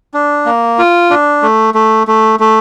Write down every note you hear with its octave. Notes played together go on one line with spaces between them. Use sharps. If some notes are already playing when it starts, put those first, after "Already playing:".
D4
A#3
F4
D4
A3
A3
A3
A3